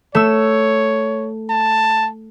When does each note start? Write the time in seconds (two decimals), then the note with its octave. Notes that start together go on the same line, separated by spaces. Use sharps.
0.15 A3 C#5 E6
1.50 A5